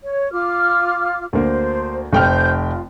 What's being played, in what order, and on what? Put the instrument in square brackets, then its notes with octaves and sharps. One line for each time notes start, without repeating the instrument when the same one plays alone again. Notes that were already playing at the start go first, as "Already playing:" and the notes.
[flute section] C#5
F4 D6 F6
[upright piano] D2 A#3 [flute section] C5
[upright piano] F1 G5 F6 [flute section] C5 G6
[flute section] F4